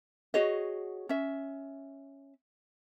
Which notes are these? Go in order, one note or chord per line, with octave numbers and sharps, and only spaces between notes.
F#4 G#4 C#5 D#5
C#4 E5